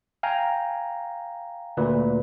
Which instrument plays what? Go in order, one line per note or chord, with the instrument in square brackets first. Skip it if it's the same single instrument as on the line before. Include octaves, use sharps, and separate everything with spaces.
[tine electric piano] F5 G5 G#5 A#5
D2 A#2 B4